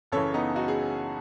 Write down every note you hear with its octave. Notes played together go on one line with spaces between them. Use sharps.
F#1 F#2 C#3 E3 A4 C#5
B3 D#4
D#4 F#4
G#4